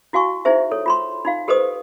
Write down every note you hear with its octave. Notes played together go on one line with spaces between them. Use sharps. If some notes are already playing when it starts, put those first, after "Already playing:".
E4 F#4 F5 G#5 C#6
D#4 E4 G#4 C5 E5
A4 C#5
F4 B5 C6
D#4 F4 F5
G4 A4 B4 C5 D#5 D#6